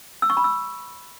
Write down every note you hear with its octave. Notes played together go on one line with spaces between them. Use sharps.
E6
C#6
B5
E6